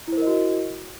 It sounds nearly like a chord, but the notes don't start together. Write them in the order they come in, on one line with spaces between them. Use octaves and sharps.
E4 C5 A#4 D#5 F#4